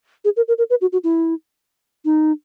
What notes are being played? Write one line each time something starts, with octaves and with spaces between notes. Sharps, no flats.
G#4
A#4
A#4
A#4
B4
F#4
F#4
E4
D#4